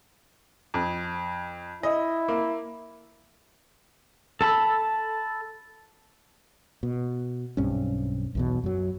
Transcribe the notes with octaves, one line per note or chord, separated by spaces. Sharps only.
F2
E4 D#5
A#3
A4 A5 B5 E6
B2
B1 G2 C4 C#4
B1 E2 B2
F#2 F#3